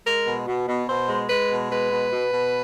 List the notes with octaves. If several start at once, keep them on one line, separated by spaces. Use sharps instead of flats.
G#3 A#4
B2
B2
B2
B2 C5
G#3
G#3 B4
B2
G#3 B4
B2
B2
B2